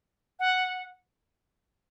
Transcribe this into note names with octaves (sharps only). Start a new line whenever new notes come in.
F#5